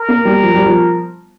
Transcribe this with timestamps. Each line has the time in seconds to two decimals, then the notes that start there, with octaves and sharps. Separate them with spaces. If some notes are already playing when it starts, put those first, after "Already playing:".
Already playing: A#4
0.08 A#3
0.25 G3
0.43 F3
0.54 G3
0.66 F3